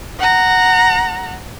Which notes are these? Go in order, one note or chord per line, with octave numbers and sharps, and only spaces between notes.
F#5 A#5